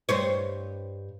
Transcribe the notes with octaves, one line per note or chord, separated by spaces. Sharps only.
G2 C5 C#5